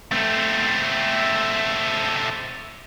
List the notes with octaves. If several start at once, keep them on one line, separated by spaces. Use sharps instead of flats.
A3 C4